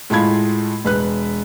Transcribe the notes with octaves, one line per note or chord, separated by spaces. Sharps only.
A2 G#3 A3 F4 B5 G#6
E1 B4 F#6